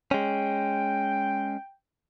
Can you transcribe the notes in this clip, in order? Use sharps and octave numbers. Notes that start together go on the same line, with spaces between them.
G#3 C#4 G5